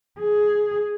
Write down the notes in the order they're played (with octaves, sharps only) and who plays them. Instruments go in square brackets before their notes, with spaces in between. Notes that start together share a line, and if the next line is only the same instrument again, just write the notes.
[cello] G#4